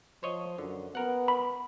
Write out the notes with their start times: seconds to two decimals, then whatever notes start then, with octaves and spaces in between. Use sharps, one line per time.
0.23 F3 C5 C#5 D#5
0.58 F#2 D3
0.95 B3 A#4 F#5
1.28 B5